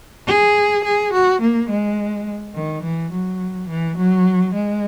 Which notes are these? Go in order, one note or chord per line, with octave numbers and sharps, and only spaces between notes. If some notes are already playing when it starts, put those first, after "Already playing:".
G#4
G#4
F#4
A#3
G#3
D#3
E3
F#3
E3
F#3
G#3